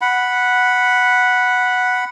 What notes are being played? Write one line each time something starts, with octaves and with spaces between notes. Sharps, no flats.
F#5 B5